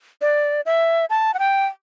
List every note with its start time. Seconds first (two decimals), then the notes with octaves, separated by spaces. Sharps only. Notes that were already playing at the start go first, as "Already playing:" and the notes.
0.21 D5
0.66 E5
1.10 A5
1.34 F#5
1.39 G5